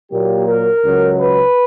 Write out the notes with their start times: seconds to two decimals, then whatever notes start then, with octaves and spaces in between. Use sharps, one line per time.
0.11 A#2 F#3 A#3 G4
0.47 A#4
0.83 C#2 C#3 F#3
1.19 B4